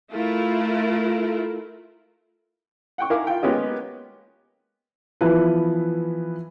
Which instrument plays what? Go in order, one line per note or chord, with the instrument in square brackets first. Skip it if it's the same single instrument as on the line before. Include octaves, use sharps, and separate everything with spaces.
[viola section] A3 E4 F4 A#4
[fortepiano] F#5 G5 C#6
E4 A#4 F5 G#5 D6
F4 G5
G#3 A#3 B3 C#4 G4 D#5
[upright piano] E3 F3 B3 E4 B4